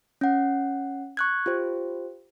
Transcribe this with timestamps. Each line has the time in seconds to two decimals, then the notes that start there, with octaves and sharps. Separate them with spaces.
0.21 C#4 F#5
1.17 C#6 F#6 G#6
1.46 F4 G4 C5